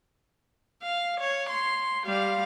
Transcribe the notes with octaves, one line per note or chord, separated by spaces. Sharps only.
F5
C#5
C6
G3 F5